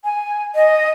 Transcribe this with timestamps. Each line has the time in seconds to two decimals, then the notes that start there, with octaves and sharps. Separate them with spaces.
0.05 G#5
0.55 D#5